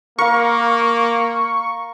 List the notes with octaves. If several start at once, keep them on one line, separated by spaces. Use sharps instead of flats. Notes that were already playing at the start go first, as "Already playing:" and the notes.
A#3 A#4 F5 C#6